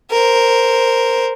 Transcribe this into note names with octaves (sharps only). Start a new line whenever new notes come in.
A#4 C5